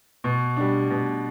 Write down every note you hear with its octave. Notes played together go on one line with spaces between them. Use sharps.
B2
G3 D4
B2